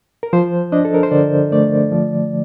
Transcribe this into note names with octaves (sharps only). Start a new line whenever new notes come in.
A#4
F3 C5
D4 D#5
A4
A#4
C5
D3 D5
A3 D5
F3